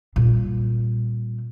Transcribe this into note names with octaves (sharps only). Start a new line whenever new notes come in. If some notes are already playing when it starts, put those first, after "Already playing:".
A#2 G3